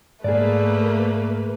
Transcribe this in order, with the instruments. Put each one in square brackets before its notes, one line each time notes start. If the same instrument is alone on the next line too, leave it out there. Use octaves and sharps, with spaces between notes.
[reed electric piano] G#2 G#4 [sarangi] A3 [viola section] A#3 B4 [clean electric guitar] D5